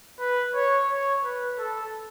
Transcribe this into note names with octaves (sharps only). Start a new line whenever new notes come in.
B4
C#5
C#5
B4
A4